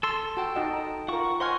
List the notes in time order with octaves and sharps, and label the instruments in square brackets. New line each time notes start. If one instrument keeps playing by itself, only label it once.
[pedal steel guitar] A4 C6 [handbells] E6
[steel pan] F#4 [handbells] G5 A5
[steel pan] D#4 F#4 D#5
A#5
[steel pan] F4 A#4 [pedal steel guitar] F#5 C#6
[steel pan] C5 F#5 G#5 [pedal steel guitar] D#5 [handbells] C6 C#6 F6